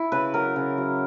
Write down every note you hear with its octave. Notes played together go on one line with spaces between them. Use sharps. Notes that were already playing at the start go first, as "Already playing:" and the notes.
Already playing: E4
C#3 B4
F#3 A#4
C#3
F#3